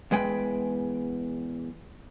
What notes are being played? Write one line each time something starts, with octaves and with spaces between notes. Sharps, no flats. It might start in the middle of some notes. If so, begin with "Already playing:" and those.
E2 G#3 B4 G5